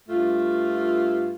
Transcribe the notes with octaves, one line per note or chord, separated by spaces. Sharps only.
G2 A3 F4